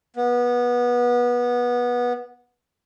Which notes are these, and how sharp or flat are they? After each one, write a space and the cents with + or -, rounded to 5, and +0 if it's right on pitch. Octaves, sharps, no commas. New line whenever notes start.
B3 -20